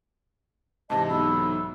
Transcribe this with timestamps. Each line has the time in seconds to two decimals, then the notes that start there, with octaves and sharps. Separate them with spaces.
0.90 G#2 C3 E3 D#5 A5
1.09 B1 B5 E6